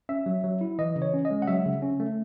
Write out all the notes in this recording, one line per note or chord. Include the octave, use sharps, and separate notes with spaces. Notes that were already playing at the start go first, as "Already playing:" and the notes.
C#4 E5
F#3
F#3
E4
E3 D#5
C#3
C#5
C#4
D#5
G#3
F#5
F#3 E5
C#3
C#4
A3